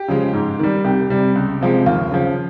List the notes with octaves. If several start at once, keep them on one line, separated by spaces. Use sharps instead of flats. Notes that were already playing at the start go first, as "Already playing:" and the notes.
Already playing: G4
C#3 F3 G#3
G#2
D#3 G3
C2 G4
C3 G3
C#2
C3 F3 G#3
D#2 F4
C#3 F3